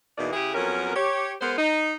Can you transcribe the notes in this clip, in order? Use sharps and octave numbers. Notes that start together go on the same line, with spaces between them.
E2 B2 E3 A#3 D#4 D5
C#3 E4 G4 G#4
F2 F#3 B3 C#4 A#4
G4 C#5
G#3 B3 A#4 C5
D#4